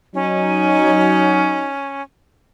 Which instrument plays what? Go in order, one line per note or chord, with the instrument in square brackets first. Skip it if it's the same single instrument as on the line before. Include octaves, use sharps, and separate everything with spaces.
[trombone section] F#3 D#4 [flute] C#4